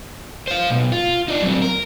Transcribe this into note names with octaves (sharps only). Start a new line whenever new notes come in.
C5 F5
B1 B2
F4
D#4 D5
F#3 C4
A#4